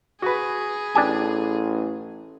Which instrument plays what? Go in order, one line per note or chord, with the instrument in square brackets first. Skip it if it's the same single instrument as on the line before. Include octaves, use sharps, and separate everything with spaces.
[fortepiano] F#4 B4 [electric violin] G#4
[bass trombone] A1 [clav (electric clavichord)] D4 G4 G#5